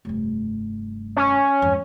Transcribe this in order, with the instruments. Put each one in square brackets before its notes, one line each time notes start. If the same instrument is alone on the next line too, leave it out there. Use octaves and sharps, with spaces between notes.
[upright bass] F1 G2
[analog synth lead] C#4
[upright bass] F2 G#2